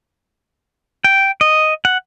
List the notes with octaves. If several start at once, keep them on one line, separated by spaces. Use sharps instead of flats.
G5
D#5
F#5